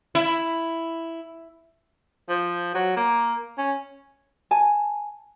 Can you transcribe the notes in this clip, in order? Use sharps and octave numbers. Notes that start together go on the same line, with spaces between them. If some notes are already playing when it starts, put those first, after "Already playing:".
E4
F3
F#3
A#3
C#4
G#5 A5